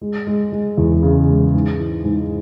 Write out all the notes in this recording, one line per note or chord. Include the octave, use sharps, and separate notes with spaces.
G#3
G#3
G#3
E2
C#3
G#3
G#2
E3
G#2